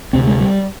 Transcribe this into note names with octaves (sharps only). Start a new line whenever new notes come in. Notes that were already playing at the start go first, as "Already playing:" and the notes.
D2 C3 C4
G#3
G3